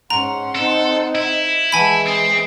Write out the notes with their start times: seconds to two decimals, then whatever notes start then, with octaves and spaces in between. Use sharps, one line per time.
0.10 G#2 C#4 F#5 A#5 C6
0.56 C4 D#4 A4
1.15 E4
1.72 E3 G#3 F#5 G#5 A5 B5
2.07 C4 D#6